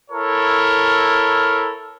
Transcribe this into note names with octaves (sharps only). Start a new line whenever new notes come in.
E4 A4 A#4 C#5